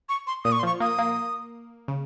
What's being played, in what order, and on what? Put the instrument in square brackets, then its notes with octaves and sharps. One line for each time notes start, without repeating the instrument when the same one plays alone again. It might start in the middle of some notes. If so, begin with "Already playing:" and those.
[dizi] C#6
C6
[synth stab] A#2 [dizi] D#6
[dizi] C#6
C6
[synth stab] F3 [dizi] C#6
[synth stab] A#3 [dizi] D#6
[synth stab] A#3
C#3